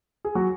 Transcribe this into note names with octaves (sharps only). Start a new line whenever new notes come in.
G#4
F#3 F#4